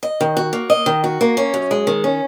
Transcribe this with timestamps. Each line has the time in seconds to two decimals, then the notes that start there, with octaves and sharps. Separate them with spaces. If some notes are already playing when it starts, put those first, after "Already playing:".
0.03 D#5
0.21 D#3
0.37 F#4
0.53 A#3
0.70 D#5
0.86 D#3
1.04 F#4
1.21 A#3
1.37 C#4
1.54 F#2
1.71 G#3
1.87 D#3
2.04 C#4